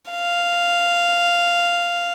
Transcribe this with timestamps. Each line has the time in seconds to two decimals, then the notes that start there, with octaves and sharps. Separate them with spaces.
0.11 F5